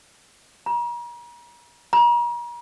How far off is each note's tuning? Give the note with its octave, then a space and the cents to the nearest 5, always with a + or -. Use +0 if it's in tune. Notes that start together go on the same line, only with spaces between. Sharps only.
A#5 +40
A#5 +40